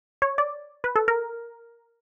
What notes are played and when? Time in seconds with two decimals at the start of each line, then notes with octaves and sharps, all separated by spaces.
0.22 C#5
0.38 D5
0.84 B4
0.96 A4
1.08 A#4